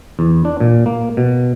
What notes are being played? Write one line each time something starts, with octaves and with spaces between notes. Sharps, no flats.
E2
D4
A#2
A#3
B2